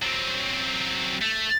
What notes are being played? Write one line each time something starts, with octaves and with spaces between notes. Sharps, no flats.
F#3 C4
A3